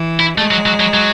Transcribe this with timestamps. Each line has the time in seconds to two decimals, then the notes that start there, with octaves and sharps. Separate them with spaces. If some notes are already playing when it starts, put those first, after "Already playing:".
Already playing: E3
0.20 E4
0.38 G#3 A3
0.51 F#3
0.66 F#3
0.80 F#3
0.94 F#3